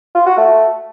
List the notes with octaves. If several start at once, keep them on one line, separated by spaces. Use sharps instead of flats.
F4
F#4
A3